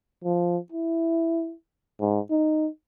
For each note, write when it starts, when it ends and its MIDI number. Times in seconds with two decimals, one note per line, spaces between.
0.24 0.57 53
0.72 1.53 64
2.01 2.19 44
2.31 2.68 63